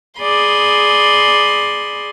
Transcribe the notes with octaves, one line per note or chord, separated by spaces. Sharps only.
G#4 D5 B5 C6 D#6